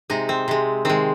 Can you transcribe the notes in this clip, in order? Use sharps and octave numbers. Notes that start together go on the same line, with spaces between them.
C3 G#3 D#4
C4
C3 G#3
D#3 G#3 C4